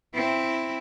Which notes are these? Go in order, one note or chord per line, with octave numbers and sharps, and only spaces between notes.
C4 E4